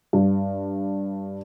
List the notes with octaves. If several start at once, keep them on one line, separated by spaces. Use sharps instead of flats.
G2